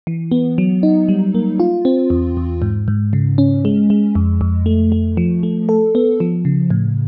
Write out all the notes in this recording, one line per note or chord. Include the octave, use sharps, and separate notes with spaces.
E3
B3
F#3
D#4
G3
A#3
F4
C4
E2
E2
G#2
G#2
C#3
C#4
G#3
G#3
F2
F2
A3
A3
F3
A3
A4
B3
F3
C#3
A2